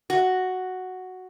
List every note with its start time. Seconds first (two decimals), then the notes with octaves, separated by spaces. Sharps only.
0.10 F#4